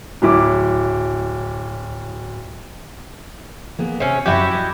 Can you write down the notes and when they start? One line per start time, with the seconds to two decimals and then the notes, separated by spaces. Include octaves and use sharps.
0.22 D1 F#3 E4 D6
3.79 A#3 B3 G#4
4.00 C3 C#4 C#5
4.26 F#2 E4 F#4 G4
4.55 D#5